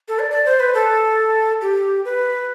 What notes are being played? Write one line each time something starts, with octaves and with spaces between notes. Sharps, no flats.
A4
D5
D5
C5
B4
A4
G4
B4